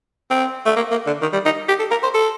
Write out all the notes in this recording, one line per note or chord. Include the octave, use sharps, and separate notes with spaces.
C4
A3
A#3
A#3
D3
D#3
G3
D#4
G4
A4
A#4
C5
A4